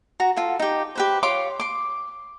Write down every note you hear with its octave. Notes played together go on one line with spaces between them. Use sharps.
F#4 A#5
F4 A4
D#4 G4
G4 B4 C5
F4 C#5 C6 D6
C6 D6